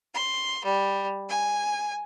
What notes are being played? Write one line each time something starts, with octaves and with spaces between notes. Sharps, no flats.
C6
G3
G#5